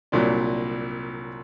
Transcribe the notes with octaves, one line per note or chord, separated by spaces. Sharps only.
C2 A#2 F#3 D4